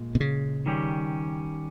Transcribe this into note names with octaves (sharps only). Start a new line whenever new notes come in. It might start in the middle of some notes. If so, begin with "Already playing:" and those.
Already playing: A#2 G#3
B2
C#3
D#3 G3 C#4 G4